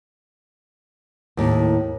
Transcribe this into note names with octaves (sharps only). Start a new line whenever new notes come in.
D#2 A2